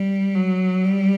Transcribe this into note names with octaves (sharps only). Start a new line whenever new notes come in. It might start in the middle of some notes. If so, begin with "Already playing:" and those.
Already playing: G3
F#3
G3